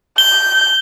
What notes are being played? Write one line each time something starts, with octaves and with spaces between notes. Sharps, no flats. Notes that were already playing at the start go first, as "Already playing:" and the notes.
G6 G7